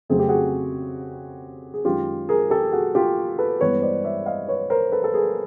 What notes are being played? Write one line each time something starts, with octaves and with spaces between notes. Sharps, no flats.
F2 C#3 F#3 A3 C4 G#4
G4
F#4 G#4
G#4
F#2 D#3 G#3 C#4 F4 G4
G#4 A#4
G4 A4
F#4 G#4
F4 G4
A4 B4
G2 E3 G#3 B3 B4 C#5
C5 D5
D5 E5
D#5 F5
B4 C#5
A#4 C5
A4 B4
A4
G#4 A#4